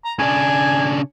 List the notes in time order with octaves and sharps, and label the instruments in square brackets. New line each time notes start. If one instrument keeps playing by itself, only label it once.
[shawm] A#5
[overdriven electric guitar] C#3 D4 [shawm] G#5